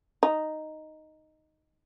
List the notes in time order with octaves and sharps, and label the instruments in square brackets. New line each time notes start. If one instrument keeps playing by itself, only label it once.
[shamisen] D#4